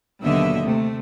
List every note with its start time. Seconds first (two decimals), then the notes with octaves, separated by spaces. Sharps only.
0.22 D#2 B2 D3 F#3 D#5 E5
0.63 C3 A3